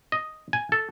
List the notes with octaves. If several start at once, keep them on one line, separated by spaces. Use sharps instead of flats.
D#5
G#5
A4